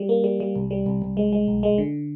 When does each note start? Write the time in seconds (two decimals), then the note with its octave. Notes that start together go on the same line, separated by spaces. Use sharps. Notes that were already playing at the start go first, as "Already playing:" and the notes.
Already playing: G3
0.09 A#3
0.24 G3
0.40 G3
0.55 C2
0.71 G3
0.86 C2
1.02 C2
1.17 G#3
1.33 G#3
1.48 B1
1.63 G#3
1.78 D3